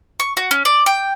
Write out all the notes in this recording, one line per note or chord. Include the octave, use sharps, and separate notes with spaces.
C#6
F#4
C#4
D5
G5